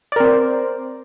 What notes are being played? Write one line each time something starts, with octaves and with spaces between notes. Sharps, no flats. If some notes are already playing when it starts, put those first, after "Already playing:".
C4 A#4 C5 D5